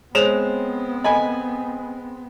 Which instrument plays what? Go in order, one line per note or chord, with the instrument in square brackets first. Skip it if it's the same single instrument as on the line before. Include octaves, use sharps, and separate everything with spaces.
[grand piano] G#3 E7 F7 [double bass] B3 C4 [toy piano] C5 C#5
[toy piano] A4 D#5 [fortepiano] G#5 B5